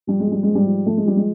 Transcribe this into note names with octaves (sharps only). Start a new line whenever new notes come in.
F3 G3
G#3
F3 G3
G#2 G#3
G3
F3
F3 A3
G#3
F3 G3
G#3